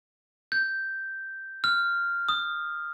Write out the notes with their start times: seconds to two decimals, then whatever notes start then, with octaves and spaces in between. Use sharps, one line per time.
0.52 G6
1.64 F6
2.29 D#6